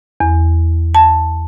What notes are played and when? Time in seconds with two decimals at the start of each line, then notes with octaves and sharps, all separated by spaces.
0.20 E2
0.95 A5